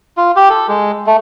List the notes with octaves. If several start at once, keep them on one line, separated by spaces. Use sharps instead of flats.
F4
G4
A4
G#3
A3